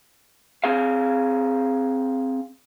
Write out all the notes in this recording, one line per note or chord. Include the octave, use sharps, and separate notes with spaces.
C4 G#4 F5